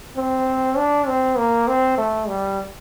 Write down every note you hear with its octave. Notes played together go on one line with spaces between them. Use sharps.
C4
D4
C4
A#3
C4
A3
G3